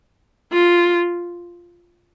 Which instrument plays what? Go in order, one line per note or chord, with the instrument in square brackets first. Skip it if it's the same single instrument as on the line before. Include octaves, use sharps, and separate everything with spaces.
[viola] F4